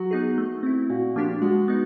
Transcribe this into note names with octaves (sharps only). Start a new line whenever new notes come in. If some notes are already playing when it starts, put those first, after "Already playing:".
Already playing: F#3 F#4
B3 D#4 G#4
A3
C4 E4
A#2 F#4
F3 A#3 D4 G4
G#3 F#4
B3 D#4